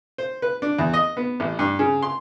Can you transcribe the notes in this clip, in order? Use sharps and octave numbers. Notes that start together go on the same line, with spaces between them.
C5
B4
D4
E2
D#5
B3
A1
G2
C#3
C6